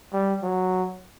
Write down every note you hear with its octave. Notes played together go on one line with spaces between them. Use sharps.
G3
F#3